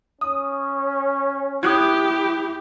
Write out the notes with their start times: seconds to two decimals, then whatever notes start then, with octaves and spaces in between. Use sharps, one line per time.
0.21 C#4 D#6
1.63 E4 G4 D#6 F#6 G#6